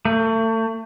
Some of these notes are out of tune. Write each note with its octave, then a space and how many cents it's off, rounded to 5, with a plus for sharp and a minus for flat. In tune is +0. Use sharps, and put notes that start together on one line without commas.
A3 +35